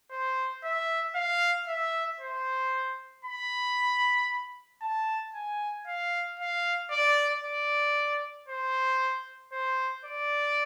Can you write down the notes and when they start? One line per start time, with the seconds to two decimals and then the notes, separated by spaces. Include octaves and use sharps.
0.11 C5
0.64 E5
1.15 F5
1.68 E5
2.20 C5
3.25 B5
4.82 A5
5.35 G#5
5.87 F5
6.39 F5
6.91 D5
7.44 D5
8.48 C5
9.53 C5
10.05 D5